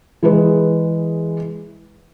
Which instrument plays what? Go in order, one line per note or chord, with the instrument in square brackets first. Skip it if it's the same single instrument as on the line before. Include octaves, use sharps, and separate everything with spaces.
[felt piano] E3 G#3 G#4 B4